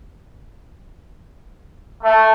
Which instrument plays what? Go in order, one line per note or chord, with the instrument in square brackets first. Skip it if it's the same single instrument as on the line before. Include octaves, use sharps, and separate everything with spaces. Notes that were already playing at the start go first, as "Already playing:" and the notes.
[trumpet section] A3